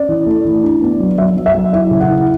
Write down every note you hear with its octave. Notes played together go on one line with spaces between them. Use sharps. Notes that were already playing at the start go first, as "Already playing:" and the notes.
Already playing: C#4 D5
E3
A3
E3
D4
B3
F#3
F#3 E5
F#3
E5
F#3
E4 E5
C#3
F#5
E4